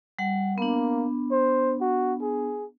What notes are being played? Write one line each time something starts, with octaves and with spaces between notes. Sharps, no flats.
G3 F#5
A#3 B3 D4
C5
F#4
G#4